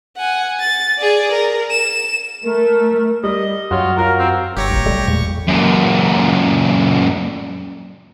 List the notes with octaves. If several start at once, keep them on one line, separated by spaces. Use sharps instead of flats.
F#5 G#5
A6
G#4 D5
A#4
E7
A3 A#4
G3 D#5
F#2 F4 F#4 C#5
F4 F#4 A#4
C4
G1 G4 C#5 A#6
A#1
B2 F#3 G3 A3
E2 A#2 G#3 C#6
F#2 A#2